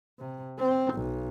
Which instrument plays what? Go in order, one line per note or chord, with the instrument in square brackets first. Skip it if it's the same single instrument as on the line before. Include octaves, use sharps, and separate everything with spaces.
[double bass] C3
C4
B1